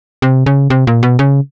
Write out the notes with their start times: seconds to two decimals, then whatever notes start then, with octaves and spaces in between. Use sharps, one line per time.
0.22 C3
0.46 C#3
0.70 C3
0.87 A#2
1.03 B2
1.19 C#3